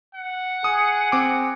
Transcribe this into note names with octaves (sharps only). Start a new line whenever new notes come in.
F#5
G#4 D#6
C4 D6